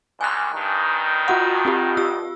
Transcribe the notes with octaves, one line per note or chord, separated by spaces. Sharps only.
C#2 G2 G#5 F#6
G2 D#3
F4 F#4 F#5
C4 F4 G4
F4 G4 E6